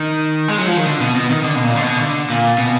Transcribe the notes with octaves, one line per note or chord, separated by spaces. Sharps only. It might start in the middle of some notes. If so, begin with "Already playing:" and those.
Already playing: D#3
G#3
F#3
F3
D#3
D3
B2
B2
D#3
D3
B2
A#2
D3
B2
D3
A#2
B2